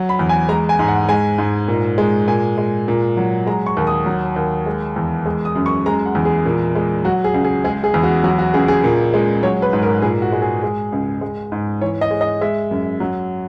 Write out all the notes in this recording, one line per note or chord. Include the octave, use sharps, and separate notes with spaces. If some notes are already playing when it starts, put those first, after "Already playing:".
Already playing: F#3
B5
E2
G#5
G#3 A#5
G#5
G#2
F#5
G#3 G#5
G#2
A#2
G#3
A#2 G#5
G#3
A#2
F#3
G#3 A#5
C#6
D#2
D#6
F#3
D#2
G#3
E2
G#3
D#6
F#2
C#6
G#3 A#5
F#5
E2
G#4
A#2
G#3
F#3 F#4
G#4
C#2
G#4
G#3 G#4
G#4
E2
F#4
F#3 F#4
F#4
C#2 G#4
G#4
A#2
G#3
F#3 C#5
B4
G#2
A#4
A#2 G#4
F#4
G#3
G#4
G#3
C#2
G#3
G#2
E3 C#5
D#5
G#3
D#5
G#3 E5
F#2
F#3